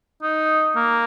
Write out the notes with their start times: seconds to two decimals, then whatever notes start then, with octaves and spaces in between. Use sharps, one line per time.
0.22 D#4
0.75 A#3